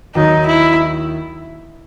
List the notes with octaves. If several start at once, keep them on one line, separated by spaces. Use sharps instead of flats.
D#2 D#3 F#3 D#4
E4